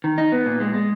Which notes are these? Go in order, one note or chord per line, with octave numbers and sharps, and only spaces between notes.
D#3
D#4
B3
A#2
G#3
G#3